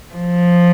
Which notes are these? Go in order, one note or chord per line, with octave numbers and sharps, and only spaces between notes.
F3